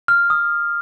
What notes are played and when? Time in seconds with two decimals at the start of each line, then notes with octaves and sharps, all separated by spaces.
0.08 F6
0.30 D#6